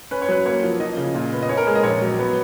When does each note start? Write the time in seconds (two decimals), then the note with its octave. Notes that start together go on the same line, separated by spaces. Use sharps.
0.11 C#4 B4
0.22 C#5
0.28 F#3 B4
0.46 A#3 C#5
0.63 F3
0.80 F3 D#5
0.97 C#3
1.15 A#2
1.33 B3
1.42 D#5
1.49 C#4 C#5
1.57 A#4
1.67 G#3
1.75 D#5
1.83 A#1 C#5
2.02 F#3
2.19 B3